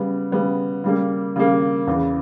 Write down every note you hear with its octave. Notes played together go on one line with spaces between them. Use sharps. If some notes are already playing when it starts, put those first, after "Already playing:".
Already playing: C#3 G3 B3
C#3 G3 B3
C#3 G3 A#3
C#3 G3 A#3
E2 C#3 E3